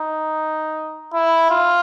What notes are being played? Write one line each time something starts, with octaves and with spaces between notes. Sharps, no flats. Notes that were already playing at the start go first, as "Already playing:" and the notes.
Already playing: D#4
E4
F4